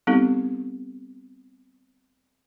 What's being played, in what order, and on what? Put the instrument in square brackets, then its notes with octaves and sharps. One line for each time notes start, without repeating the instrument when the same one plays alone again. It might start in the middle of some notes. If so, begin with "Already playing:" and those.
[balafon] G3 B3 C4 D#4 G4 A4